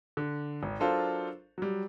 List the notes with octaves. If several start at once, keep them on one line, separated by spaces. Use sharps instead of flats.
D3
G#1
F#3 D4 F4 A4 A#4 C5
F#3 G3